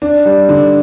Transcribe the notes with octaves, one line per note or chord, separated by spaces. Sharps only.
D4
G3
D3